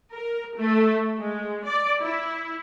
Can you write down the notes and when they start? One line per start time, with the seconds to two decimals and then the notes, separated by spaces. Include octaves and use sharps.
0.12 A#4
0.56 A3
1.19 G#3
1.65 D5
2.01 E4